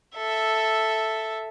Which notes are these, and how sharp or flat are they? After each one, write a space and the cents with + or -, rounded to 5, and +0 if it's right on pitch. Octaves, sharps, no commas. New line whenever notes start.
A4 +0 E5 +0